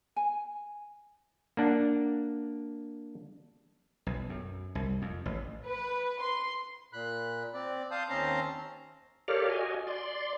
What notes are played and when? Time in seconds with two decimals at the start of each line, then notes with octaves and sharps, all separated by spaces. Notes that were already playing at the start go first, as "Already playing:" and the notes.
0.16 G#5
1.57 A#3 D4 F#5
4.07 B1
4.29 F#2
4.75 C2
5.02 F2
5.26 A1
5.64 B4
6.21 C6
6.93 A#2 B5 F#6
7.54 C4 D5
7.91 F5 A5 C6 D#6 G6
8.09 D#2 C4 C#4 A5 A#5 C6
9.28 G4 A4 A#4 C#5 D5 F5
9.49 F#4 D#5 G#5
9.87 D5 C6